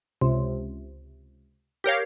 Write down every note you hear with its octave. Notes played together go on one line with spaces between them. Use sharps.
C#2 C3
G4 A#4 C#5 F5